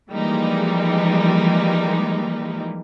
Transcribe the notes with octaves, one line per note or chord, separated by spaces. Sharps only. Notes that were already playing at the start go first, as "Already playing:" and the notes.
E3 F3 G3 G#3 A#3 D#4